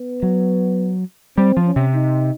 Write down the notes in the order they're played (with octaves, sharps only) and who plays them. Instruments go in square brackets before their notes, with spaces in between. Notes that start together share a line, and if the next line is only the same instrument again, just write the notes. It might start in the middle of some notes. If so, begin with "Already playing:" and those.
Already playing: [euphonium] B3
[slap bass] F#3
[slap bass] G3 [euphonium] C4
[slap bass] F3
[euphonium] C#4
[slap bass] C3
[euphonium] D#4